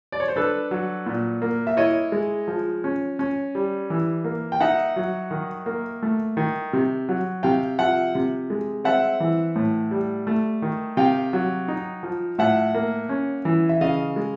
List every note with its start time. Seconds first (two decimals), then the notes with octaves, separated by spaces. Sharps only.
0.12 D5
0.20 C#5
0.28 C5
0.36 D4 A4 B4
0.71 F#3
1.06 A#2
1.42 A#3
1.67 E5
1.77 E4 C#5 D#5
2.12 G#3
2.48 F3
2.84 C#4
3.19 C#4
3.55 G3
3.90 E3
4.24 A#3
4.52 G5
4.60 D#4 E5 F#5
4.96 F#3
5.31 D#3
5.66 A#3
6.03 A3
6.37 D#3
6.73 C3
7.09 F#3
7.43 C3 F5 G5
7.79 F3 E5 F#5
8.15 C3
8.50 G#3
8.85 C4 E5 F#5
9.20 E3
9.56 A2
9.91 G3
10.27 A3
10.62 D#3
10.97 C3 F5 G5
11.33 F#3
11.68 D#4
12.03 F3
12.39 A2 E5 F#5
12.74 A#3
13.09 C#4
13.45 E3
13.69 E5
13.81 C#3 D#5 F5
14.16 G#3